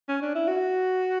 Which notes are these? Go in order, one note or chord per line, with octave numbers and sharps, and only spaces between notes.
C#4
D4
E4
F#4